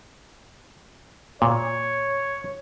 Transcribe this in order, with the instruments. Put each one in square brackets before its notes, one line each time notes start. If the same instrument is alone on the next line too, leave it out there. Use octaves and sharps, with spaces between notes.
[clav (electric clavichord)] A#2 [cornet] C#5